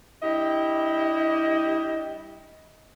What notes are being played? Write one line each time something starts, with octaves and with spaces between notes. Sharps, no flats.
G3 D4 E4 G4 D#5